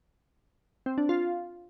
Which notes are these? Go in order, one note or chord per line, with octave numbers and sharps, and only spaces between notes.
C4
D4
F4